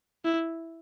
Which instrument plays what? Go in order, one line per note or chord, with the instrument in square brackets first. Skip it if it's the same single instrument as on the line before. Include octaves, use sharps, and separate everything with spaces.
[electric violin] E4